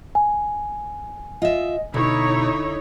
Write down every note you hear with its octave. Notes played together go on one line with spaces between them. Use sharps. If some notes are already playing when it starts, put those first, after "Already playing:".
G#5
F4 D#5 E5
B2 D3 D#4 E4 C#5